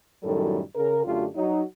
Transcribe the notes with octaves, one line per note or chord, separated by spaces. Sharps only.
F#2 A2 D#3 F#3 G3 A4
C#3 A#4
F#2 D3 A3 F4 G4
F#3 D#4